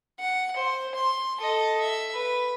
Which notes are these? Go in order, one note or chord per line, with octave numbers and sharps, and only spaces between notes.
F#5
C5
C6
A4 D#5
E5
B4